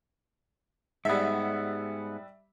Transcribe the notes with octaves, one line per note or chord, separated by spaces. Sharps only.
G#2 G3 B3 E5